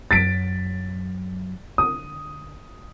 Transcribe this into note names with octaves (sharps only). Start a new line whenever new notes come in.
F#2 F#3 A6 B6 D7
D3 D#6